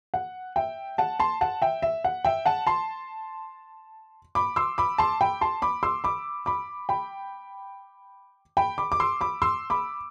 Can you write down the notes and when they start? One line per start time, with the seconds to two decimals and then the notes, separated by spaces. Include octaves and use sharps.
0.14 F#5
0.56 E5 G5
0.98 F#5 A5
1.20 A5 C6
1.41 F#5 A5
1.62 E5 G5
1.82 E5
2.05 F#5
2.25 E5 G5
2.46 F#5 A5
2.67 A5 C6
4.35 B5 D6
4.56 C6 E6
4.78 B5 D6
4.98 A5 C6
5.21 G5 B5
5.41 A5 C6
5.62 B5 D6
5.83 C6 E6
6.04 B5 D6
6.46 B5 D6
6.89 G5 B5
8.57 G5 B5
8.78 B5 D6
8.92 D6
9.00 C6 E6
9.21 B5 D6
9.42 C6 E6
9.70 B5 D6